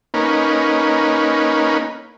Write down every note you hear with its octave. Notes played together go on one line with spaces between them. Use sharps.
A#3 C#4 D#4 B4